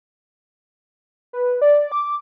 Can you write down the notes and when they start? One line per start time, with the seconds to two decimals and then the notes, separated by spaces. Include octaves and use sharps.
1.33 B4
1.62 D5
1.92 D6